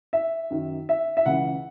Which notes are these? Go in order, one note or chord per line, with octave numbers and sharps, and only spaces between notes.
E5
F#2 D#3
E5
E5
C#2 C#3 E3 F#5